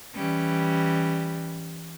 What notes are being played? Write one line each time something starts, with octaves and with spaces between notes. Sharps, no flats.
E3 G3 C#4